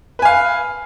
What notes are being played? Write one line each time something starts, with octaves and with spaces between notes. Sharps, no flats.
B4 F5 G#5